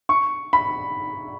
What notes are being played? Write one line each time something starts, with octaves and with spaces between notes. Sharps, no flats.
C#6
B5